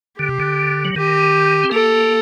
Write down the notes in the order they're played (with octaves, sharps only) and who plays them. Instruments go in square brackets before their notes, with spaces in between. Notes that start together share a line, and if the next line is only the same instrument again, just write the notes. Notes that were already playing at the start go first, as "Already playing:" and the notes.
[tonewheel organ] D3 [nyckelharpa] G4
[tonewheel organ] C3
D3
F#3
[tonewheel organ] D#3 [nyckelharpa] G4
[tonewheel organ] C4
[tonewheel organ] A#3 [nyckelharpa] A4